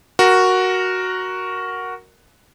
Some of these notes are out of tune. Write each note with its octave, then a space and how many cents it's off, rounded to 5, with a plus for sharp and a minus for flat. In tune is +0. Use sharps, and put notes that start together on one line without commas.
F#4 +0 A#4 +5